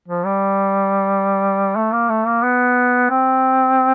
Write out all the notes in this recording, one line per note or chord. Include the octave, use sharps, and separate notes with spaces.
F3
G3
A3
A#3
A3
A#3
B3
C4